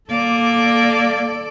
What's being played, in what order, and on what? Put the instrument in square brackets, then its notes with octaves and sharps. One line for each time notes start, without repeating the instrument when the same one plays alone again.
[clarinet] A#3 [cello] A4 D5